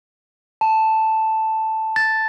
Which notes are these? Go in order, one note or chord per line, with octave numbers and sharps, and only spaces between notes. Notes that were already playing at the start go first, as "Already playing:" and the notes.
A5
A6